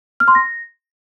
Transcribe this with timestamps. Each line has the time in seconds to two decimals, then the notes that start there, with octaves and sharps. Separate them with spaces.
0.20 F6
0.28 C6
0.35 A#6